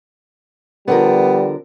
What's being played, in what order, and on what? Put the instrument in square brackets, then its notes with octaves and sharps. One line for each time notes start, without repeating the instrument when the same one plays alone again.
[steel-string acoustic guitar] D3 F3 A#4 [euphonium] G3 [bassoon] B3